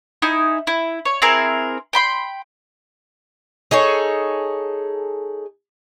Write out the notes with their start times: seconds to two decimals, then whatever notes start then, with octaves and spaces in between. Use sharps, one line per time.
0.22 D#4 E4 G#5
0.67 E4
1.05 C#5
1.22 C4 E4 G#4 A#4
1.93 G5 B5 C6
3.71 D#4 G#4 A4 C#5